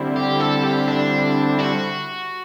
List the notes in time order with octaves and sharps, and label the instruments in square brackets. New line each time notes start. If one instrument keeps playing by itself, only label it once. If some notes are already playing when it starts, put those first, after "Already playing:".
Already playing: [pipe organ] D3 G3 C4 E4
[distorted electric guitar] G4
A4
G4
D4
F#4